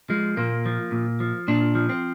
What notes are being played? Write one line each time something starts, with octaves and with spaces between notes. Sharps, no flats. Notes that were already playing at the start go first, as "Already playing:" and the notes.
F3 G#3
A#2 A#3
F3
A#2
F3
A#2 D4
F3
C4